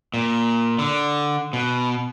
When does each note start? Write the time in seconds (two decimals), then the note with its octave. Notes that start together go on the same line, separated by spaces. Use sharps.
0.14 A#2
0.79 D3
1.53 B2